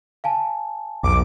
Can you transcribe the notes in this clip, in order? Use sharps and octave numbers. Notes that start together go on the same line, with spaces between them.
F5 G#5 A5
B1 E2 D6